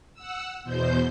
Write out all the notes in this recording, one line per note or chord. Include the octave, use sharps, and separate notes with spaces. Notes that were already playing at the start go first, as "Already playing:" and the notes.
F#5 E6
E2 B2 C5 G6